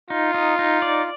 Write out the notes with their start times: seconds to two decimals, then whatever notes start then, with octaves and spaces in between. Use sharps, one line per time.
0.10 D#4 F4
0.34 D#4
0.59 D#4
0.82 D5